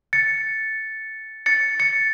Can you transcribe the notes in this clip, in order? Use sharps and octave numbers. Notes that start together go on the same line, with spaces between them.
A6 C#7
A6 C#7
A6 C#7